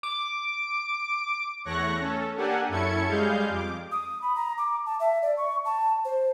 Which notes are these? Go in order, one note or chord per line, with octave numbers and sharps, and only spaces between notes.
D6
E2 A3 C#5 C#6 F#6 A#6
C#4 A4
A#3 D4 G4 A4 F#5 G#5
F#2 C#4 E4 A4 G#6 C#7
G3 G#3 G#4 F5 G6
F2 D6
D#6
B5
A#5
D6
A5
E5
D5
C#6
A5
C5